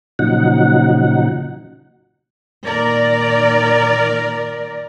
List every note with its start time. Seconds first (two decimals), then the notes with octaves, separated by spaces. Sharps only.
0.19 A#2 C#3 F3 F#3 D#4 F#5
2.64 A#2 D#3 A#4 D5